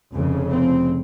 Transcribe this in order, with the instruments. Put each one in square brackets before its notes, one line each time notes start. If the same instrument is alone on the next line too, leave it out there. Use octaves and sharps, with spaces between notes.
[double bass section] F1 F2 C#3
C4